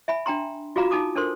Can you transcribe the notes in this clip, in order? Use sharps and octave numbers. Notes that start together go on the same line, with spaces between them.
E5 G#5 B5
D4 G5 A#5 C6
F4 F#4 G#4 F5 A#5 B5
D#4 G#5 A5 D6 D#6
D4 A4 A#4 C5 C6